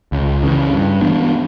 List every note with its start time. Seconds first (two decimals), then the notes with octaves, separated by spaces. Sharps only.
0.12 C#2
0.43 C#3 E3
0.72 G2
1.02 E3 B3 D4